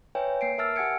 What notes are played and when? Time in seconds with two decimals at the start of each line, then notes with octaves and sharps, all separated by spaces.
0.15 B4 C#5 E5 G5 G#5
0.41 A#3 C7 D7
0.58 A#4 E5 A5 E6 F6 A6
0.75 G4 F#5 G#5 G#6 C#7 D7